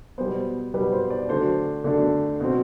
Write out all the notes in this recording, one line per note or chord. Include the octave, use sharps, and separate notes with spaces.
B2 G3 B3 C5
B2 G3 B3 B4
C5
D5
D3 F#3 A3 D4 C5
D3 F#3 A3 D4
B2 F#3 C4